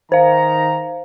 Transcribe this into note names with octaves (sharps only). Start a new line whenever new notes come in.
D#3 C5 F5 A#5